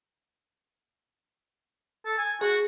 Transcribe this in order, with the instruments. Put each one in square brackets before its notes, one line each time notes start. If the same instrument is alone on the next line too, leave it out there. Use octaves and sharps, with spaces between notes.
[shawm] A4
G#5
[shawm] F#4 [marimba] G#4